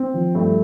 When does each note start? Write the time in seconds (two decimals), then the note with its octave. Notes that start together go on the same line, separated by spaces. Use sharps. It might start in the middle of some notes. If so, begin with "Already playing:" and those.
Already playing: C4
0.14 F3
0.35 G2 A3